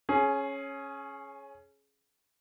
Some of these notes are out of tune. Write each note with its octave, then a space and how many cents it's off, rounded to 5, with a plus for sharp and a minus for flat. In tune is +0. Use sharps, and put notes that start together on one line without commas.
C#4 -10 G#4 +20